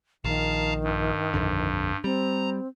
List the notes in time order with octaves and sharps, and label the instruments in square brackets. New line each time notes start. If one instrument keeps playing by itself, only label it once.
[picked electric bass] A#1 [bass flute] D#3 [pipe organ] F5 A5 A#5
[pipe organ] G2
[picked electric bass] A#1 F2 D3
[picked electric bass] G3 [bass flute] C4 [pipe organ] A#5